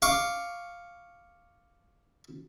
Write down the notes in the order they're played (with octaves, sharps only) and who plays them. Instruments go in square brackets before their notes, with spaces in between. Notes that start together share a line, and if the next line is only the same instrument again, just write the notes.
[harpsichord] F5 C#6 D6